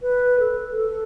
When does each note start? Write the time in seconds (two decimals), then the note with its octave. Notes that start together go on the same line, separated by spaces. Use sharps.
0.02 B4
0.39 A4
0.77 A4